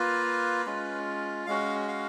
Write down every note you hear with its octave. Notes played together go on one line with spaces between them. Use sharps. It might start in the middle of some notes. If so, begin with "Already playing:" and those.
Already playing: A#3 F4 B4
G#3 C#4 F4
G#3 C#4 F#4 F5
F5